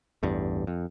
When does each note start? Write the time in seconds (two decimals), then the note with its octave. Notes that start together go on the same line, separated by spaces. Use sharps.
0.23 A1 E2 G2
0.67 F2